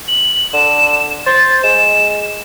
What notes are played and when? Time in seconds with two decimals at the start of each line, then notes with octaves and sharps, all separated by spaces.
0.08 F#7
0.53 D3 E7
1.26 C5 A6
1.63 G#3 E7